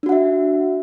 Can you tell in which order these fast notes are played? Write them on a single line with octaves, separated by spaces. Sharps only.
D4 F#4 F#5 E5